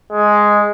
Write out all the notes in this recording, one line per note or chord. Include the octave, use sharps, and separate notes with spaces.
G#3